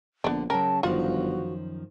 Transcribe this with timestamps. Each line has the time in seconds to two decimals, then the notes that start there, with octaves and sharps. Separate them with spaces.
0.24 A#1 D3 B3 D4
0.50 C#3 F#3 A#4 G5 A5
0.83 G1 F#2 D#3 F3 F4 F#4 F#5